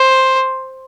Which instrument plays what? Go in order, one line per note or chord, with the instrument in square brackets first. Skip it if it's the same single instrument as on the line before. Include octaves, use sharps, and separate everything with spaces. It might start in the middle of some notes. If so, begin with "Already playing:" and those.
Already playing: [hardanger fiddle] C5